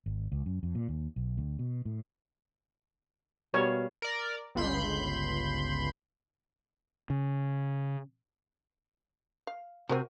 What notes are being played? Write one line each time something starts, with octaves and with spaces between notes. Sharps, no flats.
G#1
C#2
F#2
F2
A#2
D#2
B1
D2
B2
A2
B2 G3 A#3 C#5 F5
A#4 D5
G1 C#2 B5 C6 G6
C#3
F5
C3 C4 F#4 A#4 G#5